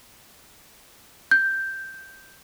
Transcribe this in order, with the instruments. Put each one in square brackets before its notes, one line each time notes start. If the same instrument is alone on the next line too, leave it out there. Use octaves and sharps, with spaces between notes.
[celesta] G6